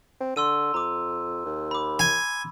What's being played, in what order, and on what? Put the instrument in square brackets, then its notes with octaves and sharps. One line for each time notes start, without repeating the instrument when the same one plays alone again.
[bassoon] C4
[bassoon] D3 [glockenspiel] C6 E6 D#7
[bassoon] F2 [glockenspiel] A#5 D6
[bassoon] D#2
[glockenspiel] B5 D6
[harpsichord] G#5